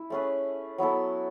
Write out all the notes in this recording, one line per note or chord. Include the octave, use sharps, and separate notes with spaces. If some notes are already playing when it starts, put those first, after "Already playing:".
Already playing: E4 E5
A3 C#4 G#4 B4
F#3 B3 E4 A4